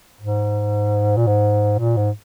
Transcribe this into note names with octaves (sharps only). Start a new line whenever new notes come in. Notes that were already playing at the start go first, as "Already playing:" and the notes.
G#2
A#2
G#2
A#2
G#2